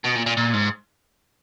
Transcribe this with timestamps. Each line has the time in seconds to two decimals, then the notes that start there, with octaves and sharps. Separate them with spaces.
0.04 B2
0.15 A#2
0.26 A#2
0.37 A#2
0.54 G#2